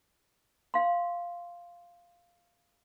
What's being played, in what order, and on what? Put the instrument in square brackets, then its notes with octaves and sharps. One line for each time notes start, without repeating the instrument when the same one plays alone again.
[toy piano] F5 C6